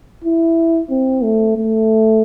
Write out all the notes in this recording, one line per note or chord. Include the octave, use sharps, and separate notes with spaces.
E4
C4
A3
A3